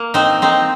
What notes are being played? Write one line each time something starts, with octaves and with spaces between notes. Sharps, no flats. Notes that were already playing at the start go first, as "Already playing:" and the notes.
Already playing: A#3
C4 D#4
C4 D#4